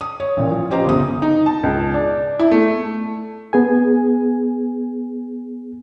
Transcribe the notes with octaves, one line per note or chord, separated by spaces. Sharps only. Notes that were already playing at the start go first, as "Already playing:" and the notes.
D#6
C#5
A1 A#2
F3
C#4 F4 G4 C5 D#5 A#5
G1 C#2 D#6
D#4
A5
C#2
D4
E4
A3
B3 G#4 G#5